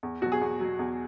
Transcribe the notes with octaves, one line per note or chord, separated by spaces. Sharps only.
E2
B2 F#3 F#4
G#4
E2
B2 F#3
E2